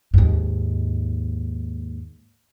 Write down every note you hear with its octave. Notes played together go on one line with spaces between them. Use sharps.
D#2 G#2